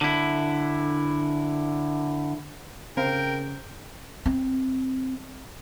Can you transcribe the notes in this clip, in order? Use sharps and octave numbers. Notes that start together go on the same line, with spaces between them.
D3 E4
C#3 C4 A#4 F5 G5
C4